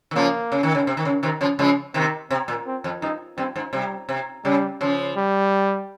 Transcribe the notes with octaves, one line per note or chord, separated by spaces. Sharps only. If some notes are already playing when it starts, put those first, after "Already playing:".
D#3
C#3 F3 A#3
C#3
D#3
C#3
C3
D#3
C#3
C3 D#3
C#3 F3
C#3 F3 G#3
C3 D#3 C4
C3 C4
A#2
C4
F2
G2 D#4
G2 C4
G#2
C3 G3
C3
C#3 G3
C#3 F3
G3